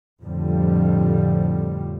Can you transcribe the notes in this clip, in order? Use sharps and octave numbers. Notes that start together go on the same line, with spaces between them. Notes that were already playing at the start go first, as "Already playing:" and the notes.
F2 A2 D3 F3 G3